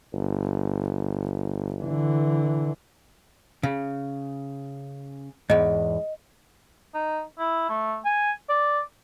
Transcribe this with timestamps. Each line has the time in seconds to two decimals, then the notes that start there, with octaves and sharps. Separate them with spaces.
0.13 G1
1.81 D3 E3
3.63 C#3
5.50 E2 G#2 D#5
6.94 D#4
7.39 E4
7.69 A3
8.05 G#5
8.49 D5